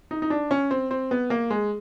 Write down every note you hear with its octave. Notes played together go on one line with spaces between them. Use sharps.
D#4
D#4
D4
C#4
C4
C4
B3
A#3
G#3